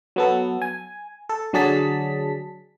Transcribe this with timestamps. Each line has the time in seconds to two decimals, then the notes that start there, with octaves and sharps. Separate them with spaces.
0.16 F#3 B3 A4
0.62 G#5
1.29 A4
1.53 D3 F#3 D4 G#4 A5 B6